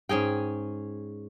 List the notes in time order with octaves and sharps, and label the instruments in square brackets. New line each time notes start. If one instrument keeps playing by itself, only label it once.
[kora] G#2 C#4 G#4 G5